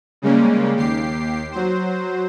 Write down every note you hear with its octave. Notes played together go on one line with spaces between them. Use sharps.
C#3 G3 G#3 A#3 C#4
D#2 G4 C7
F#3 C5